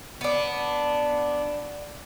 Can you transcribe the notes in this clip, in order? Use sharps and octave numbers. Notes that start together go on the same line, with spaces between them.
B3 D4